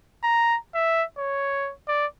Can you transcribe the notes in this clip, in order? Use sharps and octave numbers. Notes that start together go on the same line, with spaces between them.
A#5
E5
C#5
D5